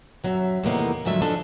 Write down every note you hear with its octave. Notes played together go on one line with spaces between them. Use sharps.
F#2 F#3 E5
E2 A2 C3 D#3 A#3 B3
G#2 D3 F3 F#3 E5
E3 F3 D4 A4 D#5